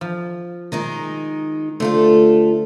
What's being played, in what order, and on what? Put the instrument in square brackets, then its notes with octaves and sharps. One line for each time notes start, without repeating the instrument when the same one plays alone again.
[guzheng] F3
[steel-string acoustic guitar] D#3 G#3 D#4
[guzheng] D3 C5 [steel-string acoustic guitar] A3 F4 A4